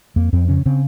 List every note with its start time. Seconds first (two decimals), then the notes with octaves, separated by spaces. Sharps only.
0.16 F2 A#3
0.33 F2 C4
0.48 C#3 C#4
0.66 C#3 C4